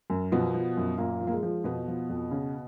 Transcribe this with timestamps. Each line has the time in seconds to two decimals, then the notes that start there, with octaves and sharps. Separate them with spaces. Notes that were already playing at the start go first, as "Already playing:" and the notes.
0.10 F#2
0.32 B2 F3 B3
0.54 F3
0.77 F#2
0.98 F#2 A#2 A#3
1.21 F3
1.27 A#3
1.32 G#3
1.43 F3
1.64 F2 B2 B3
1.88 F3
2.10 F2
2.31 C#3